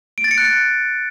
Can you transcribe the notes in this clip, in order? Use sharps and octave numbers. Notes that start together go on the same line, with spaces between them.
D7
A6
C#7
F#6
A6